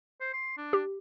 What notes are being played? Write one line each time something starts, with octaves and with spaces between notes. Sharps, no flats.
C5
C6
D4
G4